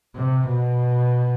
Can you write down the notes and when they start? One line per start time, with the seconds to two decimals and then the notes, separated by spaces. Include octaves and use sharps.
0.16 C3
0.49 B2